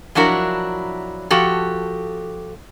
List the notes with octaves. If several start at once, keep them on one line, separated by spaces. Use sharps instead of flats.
F3 F#3 D4 E4 F#4 A#4
F3 F#4 G4 A4